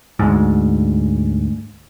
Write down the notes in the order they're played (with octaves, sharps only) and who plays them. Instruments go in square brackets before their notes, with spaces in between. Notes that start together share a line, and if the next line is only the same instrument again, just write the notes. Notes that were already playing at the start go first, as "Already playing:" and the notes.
[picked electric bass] D2 G#2